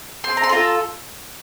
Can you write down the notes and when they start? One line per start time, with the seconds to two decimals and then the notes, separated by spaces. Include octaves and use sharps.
0.24 C4 C6
0.37 A#5
0.43 C6
0.49 F4 A4 A#5